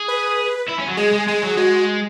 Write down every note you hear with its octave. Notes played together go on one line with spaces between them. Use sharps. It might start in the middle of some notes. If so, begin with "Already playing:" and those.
Already playing: G#4
B4
E4
C#4
F#3
G#3 G#4
G#3
G#3 G#4
F#3
G#3 F#4